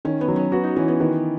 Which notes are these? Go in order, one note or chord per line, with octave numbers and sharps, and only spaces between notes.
D#3 C#4
B3
F#3
C#4
B3 F#4
D#4
E3 C#4
B3
D#3 B3